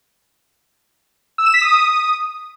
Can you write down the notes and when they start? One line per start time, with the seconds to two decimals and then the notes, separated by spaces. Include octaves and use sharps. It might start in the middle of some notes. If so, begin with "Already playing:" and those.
1.38 E6
1.46 E7
1.54 B6
1.61 D#6